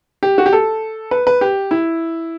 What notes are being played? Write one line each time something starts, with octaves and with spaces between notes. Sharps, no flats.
G4
F#4
G4
A4
B4
B4
G4
E4